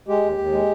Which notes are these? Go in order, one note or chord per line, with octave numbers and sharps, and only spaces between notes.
G#3 G4
D#2
D#2
G#3